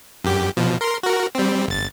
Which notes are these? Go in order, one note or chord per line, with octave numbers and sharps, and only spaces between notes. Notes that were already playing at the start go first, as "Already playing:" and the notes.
F#2 G4
B2 F3
A#4 C6
F#4 A#4
G3 C4
G1 A6